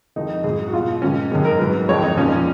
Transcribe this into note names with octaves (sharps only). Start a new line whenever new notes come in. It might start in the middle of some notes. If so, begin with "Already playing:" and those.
F2 D#3 G#3 D#4
G#2 G#4
F#3
F#4
B2 F#3 F4
G#2 D#3 F#3 C#4
F#2 D#3 G#3 C#4
A#4
G#2 F#3 B4
F2 D#3 G#3 C#5
D#4
A#2 F3 G#3 C#4